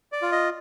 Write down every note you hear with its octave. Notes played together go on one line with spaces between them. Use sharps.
D5
F4
D#5